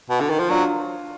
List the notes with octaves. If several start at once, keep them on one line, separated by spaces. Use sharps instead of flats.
B2
D3
D#3
F3
F#3 D4 F4